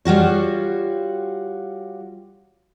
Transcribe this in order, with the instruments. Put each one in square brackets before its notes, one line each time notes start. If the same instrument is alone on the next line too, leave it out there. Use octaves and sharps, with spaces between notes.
[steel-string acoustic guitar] G3 F4 F#4 C#5